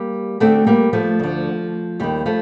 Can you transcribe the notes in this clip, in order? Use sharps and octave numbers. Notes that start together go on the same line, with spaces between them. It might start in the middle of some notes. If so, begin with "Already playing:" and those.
Already playing: G3 A#3
D2 D3 A3 C4
G3 A#3
F3 A3
D2 D3
D#2 D#3 G3
F3 A3